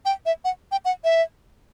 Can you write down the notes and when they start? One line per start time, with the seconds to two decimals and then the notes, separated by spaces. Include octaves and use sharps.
0.05 G5
0.26 E5
0.45 F#5
0.72 G5
0.85 F#5
1.04 E5